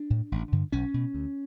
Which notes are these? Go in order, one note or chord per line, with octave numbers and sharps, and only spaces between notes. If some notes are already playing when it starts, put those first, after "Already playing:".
Already playing: D4
A2
A1
G2 D3
B1 C#4
B2
D2